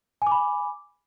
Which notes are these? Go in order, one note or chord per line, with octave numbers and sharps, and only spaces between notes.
G#5 B5 D6